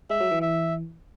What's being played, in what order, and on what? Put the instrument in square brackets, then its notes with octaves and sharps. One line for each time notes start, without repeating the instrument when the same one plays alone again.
[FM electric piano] G#3 [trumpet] E5
[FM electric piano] F#3
E3
[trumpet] E5